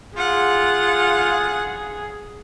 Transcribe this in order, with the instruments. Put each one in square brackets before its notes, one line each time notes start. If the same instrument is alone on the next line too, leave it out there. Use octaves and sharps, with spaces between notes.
[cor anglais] F4 [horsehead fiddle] G#4 [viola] F#5